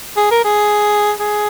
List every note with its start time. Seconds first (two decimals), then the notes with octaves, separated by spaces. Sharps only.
0.16 G#4
0.31 A#4
0.44 G#4
1.20 G#4